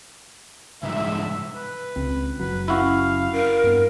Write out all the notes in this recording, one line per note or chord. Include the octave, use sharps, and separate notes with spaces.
C2 G#2 E5
B4
C#2 C4
F#1 F#3 B4
C#4 E4 F#4 F5
A#4
G2 B3